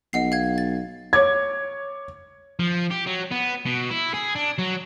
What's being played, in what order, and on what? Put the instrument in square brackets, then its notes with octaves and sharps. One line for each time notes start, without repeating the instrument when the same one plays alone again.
[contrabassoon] B1 [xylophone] D#5 F#5 C7
[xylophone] F5 G#6
A6
[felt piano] C#5 D6 G#6
[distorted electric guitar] F3
G4
F#3
B3
B2
E4
G#4
D4
F#3